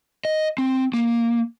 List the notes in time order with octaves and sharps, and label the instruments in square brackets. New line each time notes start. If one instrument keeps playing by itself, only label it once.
[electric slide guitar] D#5
C4
A#3